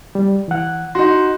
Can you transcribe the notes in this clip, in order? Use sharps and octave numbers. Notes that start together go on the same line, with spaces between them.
G3
E3 F#5
D#4 F#4 C6